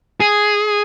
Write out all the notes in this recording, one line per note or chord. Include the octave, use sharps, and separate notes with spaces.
G#4